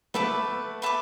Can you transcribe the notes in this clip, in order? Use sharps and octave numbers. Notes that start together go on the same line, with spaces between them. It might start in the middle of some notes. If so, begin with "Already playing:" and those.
A3 B3 B4 E5 A5 D6
B4 E5 A5 D6